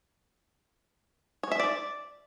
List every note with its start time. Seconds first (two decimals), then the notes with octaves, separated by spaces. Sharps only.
1.43 C#5
1.51 E5
1.60 D5